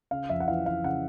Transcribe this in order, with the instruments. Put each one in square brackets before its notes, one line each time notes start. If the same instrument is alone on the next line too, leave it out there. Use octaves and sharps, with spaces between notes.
[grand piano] C#3 F5
F2 E5
F#5
E3 F5
F2 F5
C#3 F#5